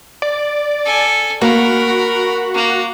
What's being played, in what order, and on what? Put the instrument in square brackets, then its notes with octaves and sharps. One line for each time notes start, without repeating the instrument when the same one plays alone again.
[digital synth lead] D5
[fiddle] A4 G#5
[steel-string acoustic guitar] A#3 [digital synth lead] F#4 [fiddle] A#4 B5
[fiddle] A#3